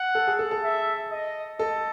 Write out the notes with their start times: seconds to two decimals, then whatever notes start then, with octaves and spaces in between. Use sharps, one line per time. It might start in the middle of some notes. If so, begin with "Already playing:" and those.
Already playing: F#5
0.15 A4
0.27 G#4
0.39 A4
0.51 A4
0.63 E5
1.11 D#5
1.59 A4 D#5